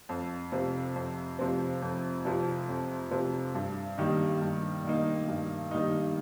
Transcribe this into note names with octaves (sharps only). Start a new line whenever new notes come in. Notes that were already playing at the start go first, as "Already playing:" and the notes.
F2
C3 F3 C4
F2
C3 F3 C4
F2
C3 F3 C4
F2
C3 F3 C4
G2
D#3 G3 A#3 D#4
G2
D#3 G3 A#3 D#4
G2
D#3 G3 A#3 D#4